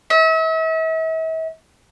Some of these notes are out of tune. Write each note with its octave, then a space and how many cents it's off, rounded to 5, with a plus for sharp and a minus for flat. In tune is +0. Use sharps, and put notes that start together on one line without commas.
E5 -40